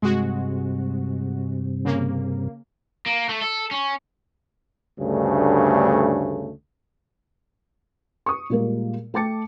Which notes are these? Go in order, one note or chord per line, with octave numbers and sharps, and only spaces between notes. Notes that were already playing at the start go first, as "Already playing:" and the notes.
G2 C3 G#3 F#4
C#3 A#3
A#3
A3
A4
C#4
D2 G2 C#3 A3
C#6 D#6
A#2 G3 G#3 A#3 A#4
A3 G5 A5 D6 A6 C#7